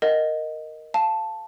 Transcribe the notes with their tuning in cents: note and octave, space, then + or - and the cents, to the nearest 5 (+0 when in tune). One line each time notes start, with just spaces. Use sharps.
A#4 -5 D#5 +0 F#5 -25
F5 +0 A5 +0